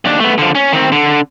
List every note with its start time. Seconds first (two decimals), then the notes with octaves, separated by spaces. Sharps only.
0.05 D#2 D4
0.20 A3 B3
0.38 D3 F3
0.55 C#4
0.73 D#3 C4
0.92 D3